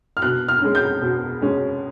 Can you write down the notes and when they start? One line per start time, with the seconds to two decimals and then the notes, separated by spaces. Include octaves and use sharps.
0.17 F6
0.22 B2 F#6
0.48 F6
0.62 G#3 C#4
0.75 G6
1.01 B2
1.42 G#3 C#4